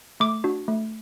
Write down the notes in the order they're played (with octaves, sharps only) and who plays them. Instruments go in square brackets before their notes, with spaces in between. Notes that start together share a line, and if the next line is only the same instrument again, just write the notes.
[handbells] A3 D6
D4 F#4
A3